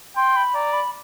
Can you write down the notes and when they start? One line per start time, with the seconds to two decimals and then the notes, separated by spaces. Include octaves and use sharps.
0.17 G5 C6
0.36 B5
0.54 D5 A#5
0.73 B5